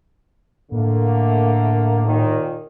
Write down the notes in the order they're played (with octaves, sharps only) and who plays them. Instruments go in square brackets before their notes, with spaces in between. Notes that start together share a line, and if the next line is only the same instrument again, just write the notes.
[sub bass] A2 [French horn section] D3 A3 A#3
[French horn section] D#2 A#2 D#3